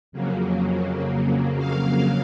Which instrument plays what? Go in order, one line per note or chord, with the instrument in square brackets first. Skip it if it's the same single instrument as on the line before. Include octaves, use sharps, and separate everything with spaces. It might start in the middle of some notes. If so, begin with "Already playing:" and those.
[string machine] F2 C#3 F#3 A#3
F5